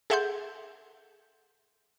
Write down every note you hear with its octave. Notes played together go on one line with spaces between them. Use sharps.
G#4 A4 E5 F#5 C6 G6